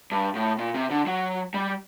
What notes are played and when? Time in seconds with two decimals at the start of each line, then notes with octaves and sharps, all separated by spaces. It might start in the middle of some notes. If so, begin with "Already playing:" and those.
0.12 G2
0.35 A2
0.58 A#2
0.75 C3
0.90 D3
1.07 F#3
1.54 G3